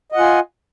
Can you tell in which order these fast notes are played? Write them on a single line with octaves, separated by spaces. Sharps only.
D#5 F#5 F4 G#5